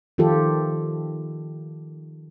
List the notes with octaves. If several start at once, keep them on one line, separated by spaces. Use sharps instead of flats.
D#3 F3 F4 G4 A4